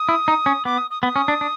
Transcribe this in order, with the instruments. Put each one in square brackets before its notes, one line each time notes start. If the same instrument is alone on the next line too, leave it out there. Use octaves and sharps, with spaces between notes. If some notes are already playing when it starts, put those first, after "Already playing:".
Already playing: [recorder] D#6
[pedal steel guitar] E4
D#4
C#4
[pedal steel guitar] B3 [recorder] D6
[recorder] D#6
D#6
[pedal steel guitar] B3 [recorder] D#6
[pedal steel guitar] C#4
D4
D4